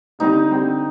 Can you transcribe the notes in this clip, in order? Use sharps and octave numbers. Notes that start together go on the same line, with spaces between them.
D3 G3 C4 D#4 G4
D3 G3 C4 G4